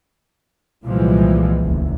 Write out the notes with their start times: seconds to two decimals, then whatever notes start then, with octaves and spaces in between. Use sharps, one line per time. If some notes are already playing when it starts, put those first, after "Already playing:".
0.83 C2 A#2 E3 F3 G3 G#3
1.60 F#1 D2